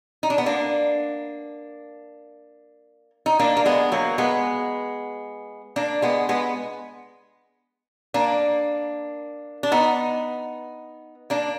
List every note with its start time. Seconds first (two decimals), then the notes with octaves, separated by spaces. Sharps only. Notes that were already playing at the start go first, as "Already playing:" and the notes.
0.23 D#4
0.30 D4
0.38 B3
0.46 A#3 D4
3.26 D#4
3.39 A#3 D4
3.57 A#3
3.65 G#3 B3
3.92 F#3 A#3
4.18 G#3 B3
5.76 A#3 D4
6.02 G#3 B3
6.29 G#3 B3
8.14 A#3 D4
9.63 D4
9.72 B3 D#4
11.30 A#3 D4